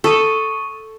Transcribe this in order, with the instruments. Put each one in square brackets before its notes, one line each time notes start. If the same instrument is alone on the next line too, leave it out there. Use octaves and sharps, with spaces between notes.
[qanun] A4 [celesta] C#6 D#6 D#7